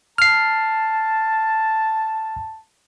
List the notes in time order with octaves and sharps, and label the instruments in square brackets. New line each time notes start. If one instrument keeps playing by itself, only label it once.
[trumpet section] A5 [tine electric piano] F6 C7